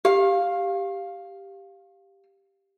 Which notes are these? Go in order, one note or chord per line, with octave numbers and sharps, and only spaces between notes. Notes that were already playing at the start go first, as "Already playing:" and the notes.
G4 F5